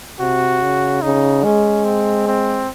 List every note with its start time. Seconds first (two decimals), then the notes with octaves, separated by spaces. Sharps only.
0.20 C3 F#4
0.62 C#3
1.02 C#3 D#4
1.44 G#3 C#4
1.85 C4
2.27 C4